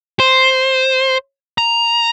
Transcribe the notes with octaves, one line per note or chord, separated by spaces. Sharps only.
C5
A#5